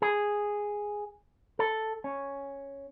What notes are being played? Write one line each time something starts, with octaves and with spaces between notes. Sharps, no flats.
G#4
A4
C#4